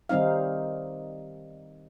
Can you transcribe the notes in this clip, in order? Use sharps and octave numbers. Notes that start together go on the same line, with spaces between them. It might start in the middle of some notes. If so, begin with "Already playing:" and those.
D#3 G3 C4 D#4 F5